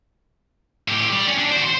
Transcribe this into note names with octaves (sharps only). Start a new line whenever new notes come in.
A2 G4
G4 D5
C#4
D4
F#4 C5
C5 C6